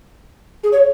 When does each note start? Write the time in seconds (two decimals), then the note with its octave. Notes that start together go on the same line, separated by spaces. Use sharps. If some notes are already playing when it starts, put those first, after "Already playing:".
0.64 G#4
0.72 C#5